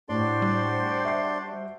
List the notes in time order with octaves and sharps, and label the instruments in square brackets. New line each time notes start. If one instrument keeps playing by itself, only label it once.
[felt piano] A2 [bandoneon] D4 D5 C6 [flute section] F#4 G4 C5
[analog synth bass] G3
[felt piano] E5 C7